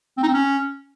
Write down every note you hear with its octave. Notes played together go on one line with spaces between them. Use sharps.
C4
D#4
C4
C#4